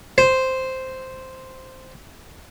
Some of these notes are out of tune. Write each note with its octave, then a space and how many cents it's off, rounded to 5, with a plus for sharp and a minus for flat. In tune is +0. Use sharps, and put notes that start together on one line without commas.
C5 -5